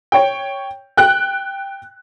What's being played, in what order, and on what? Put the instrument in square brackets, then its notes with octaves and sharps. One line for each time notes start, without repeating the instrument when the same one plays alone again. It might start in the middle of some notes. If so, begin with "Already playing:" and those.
[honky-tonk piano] C#5 G5
G5 F#6